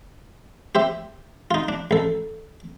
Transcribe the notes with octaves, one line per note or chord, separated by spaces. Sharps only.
G4 C5 E5
D#4 F4
D4
A1 A4